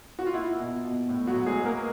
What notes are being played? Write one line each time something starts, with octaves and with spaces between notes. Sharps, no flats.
F#4
F4
A#3 E4
B2
B2
A2
F#3 F#4
A2
G#3 G#4
B3
A#3 A#4